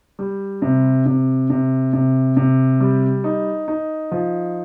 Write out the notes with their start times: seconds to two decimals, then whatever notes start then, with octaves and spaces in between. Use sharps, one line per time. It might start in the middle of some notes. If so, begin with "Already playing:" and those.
0.19 G3
0.62 C3
1.06 C3
1.50 C3
1.93 C3
2.37 C3
2.80 G3
3.24 D#4
3.68 D#4
4.12 F3